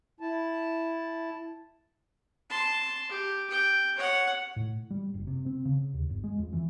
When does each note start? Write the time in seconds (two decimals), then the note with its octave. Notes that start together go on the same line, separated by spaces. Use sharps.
0.20 E4 A5
2.50 A5 C6
3.09 G4
3.51 G5
3.96 C#5 F#5
4.56 A2
4.91 G3
5.14 F#1
5.27 C3
5.46 C4
5.65 C#3
5.94 D#2
6.10 G1
6.24 G#3
6.39 F2
6.53 E3